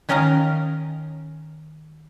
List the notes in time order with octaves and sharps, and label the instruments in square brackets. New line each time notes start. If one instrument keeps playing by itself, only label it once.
[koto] D#3 C#4 A#4 D#5 F5 A#5